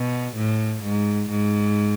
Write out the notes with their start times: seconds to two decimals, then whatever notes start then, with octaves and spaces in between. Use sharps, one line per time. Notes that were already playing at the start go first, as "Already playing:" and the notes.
Already playing: B2
0.36 A2
0.83 G#2
1.30 G#2